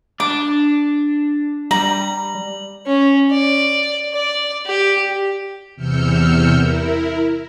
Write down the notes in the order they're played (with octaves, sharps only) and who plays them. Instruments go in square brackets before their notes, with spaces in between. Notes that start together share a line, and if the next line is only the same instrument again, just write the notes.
[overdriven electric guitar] D4 [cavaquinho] D6
[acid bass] G3 [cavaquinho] A#5 [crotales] F#7
[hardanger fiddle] C#4
D5
D5
G4
[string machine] E2 C3 E6 F6 G6 C#7
E4 A#4